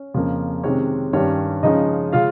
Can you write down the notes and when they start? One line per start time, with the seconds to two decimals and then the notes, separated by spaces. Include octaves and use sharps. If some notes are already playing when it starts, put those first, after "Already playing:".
Already playing: C#4
0.14 F2 C#3 F3 A#3
0.63 C3 D#3 G#3 C4 C#4 C#5
1.13 G2 D#3 G3 C#4 C#5
1.63 C#3 F3 G#3 C#4 D#4 D#5
2.13 C#3 G#3 C#4 F4 F5